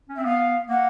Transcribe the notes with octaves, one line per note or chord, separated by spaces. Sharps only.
C#4
C4 E5
B3 F5
A#3 F#5